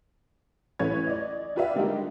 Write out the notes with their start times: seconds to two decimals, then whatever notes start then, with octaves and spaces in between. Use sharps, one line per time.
0.79 A1 E3 A3 B4 C#5 G#6
1.07 D5 D#5
1.56 F4 G4 B4 D5 E5 F5
1.75 D3 G3 G#3 A#3 D#4 G4